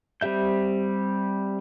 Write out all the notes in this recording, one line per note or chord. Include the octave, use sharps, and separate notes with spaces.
G3 C4 G4 E5 G6